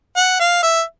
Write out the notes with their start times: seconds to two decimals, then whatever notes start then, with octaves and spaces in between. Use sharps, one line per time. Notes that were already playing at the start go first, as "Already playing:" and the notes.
0.17 F#5
0.40 F5
0.63 E5